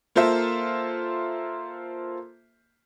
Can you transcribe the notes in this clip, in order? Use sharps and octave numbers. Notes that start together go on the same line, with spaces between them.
A#3 F4 A4 C5 E5